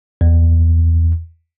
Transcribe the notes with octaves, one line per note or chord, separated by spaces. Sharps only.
E2